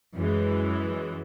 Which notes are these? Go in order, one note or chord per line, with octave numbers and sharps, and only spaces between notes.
F#2 E3 G#3